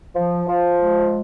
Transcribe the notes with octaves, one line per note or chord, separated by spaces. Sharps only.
F3
F3
G#3